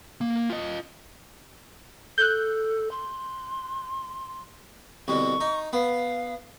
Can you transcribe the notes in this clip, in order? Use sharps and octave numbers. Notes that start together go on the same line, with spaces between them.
A#3
F4 D#5
A4 F#6 G6
C6
C2 B2 D3 C#6
D#4
B3 F5